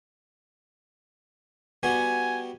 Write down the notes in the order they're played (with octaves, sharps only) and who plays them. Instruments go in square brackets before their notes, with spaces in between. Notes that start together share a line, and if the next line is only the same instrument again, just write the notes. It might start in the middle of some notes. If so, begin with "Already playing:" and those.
[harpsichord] G3 B3 F#4 [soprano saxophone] G#5